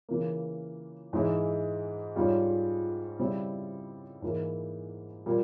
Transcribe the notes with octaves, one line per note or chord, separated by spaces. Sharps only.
C#3 E3 A#3
G#2 E3 G#3 E4
G#2 G3 C#4 F4
C#3 G3 C4 E4
G#2 E3 A#3 E4
A#2 G3 A#3